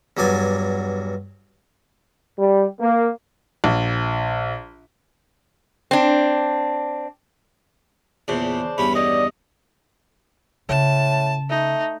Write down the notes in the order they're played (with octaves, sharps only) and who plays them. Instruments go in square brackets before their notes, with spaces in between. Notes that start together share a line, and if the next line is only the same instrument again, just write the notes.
[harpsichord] E2 G2 F#3 D5 G#5
[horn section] G3
A#3
[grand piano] A#1
[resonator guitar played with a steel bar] C4 D4
[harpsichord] E2 A#2 [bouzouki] C#3 D4 C5
[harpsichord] E2 G2 C#4 [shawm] B5
[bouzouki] D3 D#3 D5 [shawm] D#5
[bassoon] A2 [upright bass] C#3 [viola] A5
[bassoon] A3 [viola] D#4